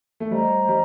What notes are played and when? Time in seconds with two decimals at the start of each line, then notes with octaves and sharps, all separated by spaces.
0.20 A3
0.31 G3 C5 D#5 A#5
0.68 G3